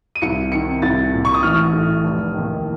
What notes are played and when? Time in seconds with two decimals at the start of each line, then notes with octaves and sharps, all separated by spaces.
0.15 D#7
0.22 C2 C#7
0.52 C3 D#3 C#7
0.82 C2 A6
1.13 A#2
1.25 C#6
1.34 D#6
1.43 A1 F6
1.73 A2
2.04 F1
2.34 D#2 D#3